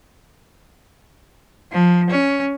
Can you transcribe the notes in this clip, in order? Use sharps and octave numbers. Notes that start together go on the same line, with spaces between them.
F3
C#4